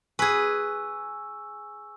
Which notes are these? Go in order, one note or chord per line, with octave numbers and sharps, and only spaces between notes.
G#4 B4 G#5 C#6 E6